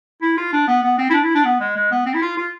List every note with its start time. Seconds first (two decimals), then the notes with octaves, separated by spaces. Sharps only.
0.22 E4
0.37 F4
0.52 D4
0.68 B3
0.83 B3
0.98 C4
1.10 E4
1.14 D4
1.24 E4
1.35 D4
1.45 B3
1.60 G#3
1.76 G#3
1.91 B3
2.06 C4
2.14 E4
2.22 F4
2.37 F4